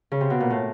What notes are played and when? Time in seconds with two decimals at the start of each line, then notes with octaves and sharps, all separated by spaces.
0.12 C#3
0.21 C3
0.30 B2
0.40 A#2
0.50 A2